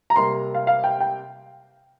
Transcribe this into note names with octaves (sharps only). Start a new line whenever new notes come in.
A#5
C3 G3 A#3 C6
F5
F5
G5
G5